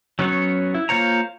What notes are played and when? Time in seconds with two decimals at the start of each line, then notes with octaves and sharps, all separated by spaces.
0.19 F#3 B3 C#4 F#4 C#5
0.74 E4
0.89 A#3 F4 C5 C#5 A#5